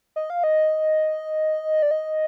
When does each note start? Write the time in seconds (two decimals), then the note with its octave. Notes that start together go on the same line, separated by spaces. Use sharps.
0.16 D#5
0.30 F5
0.44 D#5
1.82 D5
1.91 D#5